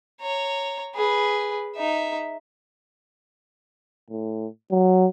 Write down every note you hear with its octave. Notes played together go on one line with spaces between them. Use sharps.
C#5 A#5
G#4 B4
D#4 E5
A2
F#3